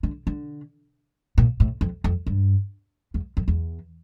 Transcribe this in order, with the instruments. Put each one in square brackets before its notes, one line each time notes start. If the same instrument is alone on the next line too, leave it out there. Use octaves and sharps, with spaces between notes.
[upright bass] D3
D3
A#2
A2
F2
F2
G2
E2
F2
E2